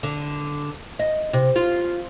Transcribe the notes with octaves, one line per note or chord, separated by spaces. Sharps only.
D3
D#5
C3
F4